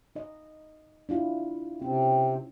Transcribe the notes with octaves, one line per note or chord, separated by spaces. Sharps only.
D#4 D#5
D4 E4 F4
C3 C4 C#4